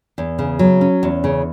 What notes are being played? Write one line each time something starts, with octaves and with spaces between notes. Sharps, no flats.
E2
C#3
F#3
C#4
E2
C#3